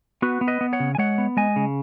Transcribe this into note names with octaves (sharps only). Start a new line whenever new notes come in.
B3 F#4 B4
B3
B4 D#5
B3
C#5 F#5
C#3
G#5
G#3 C#5 F#5
B3
G#3 D#5 G#5
C#3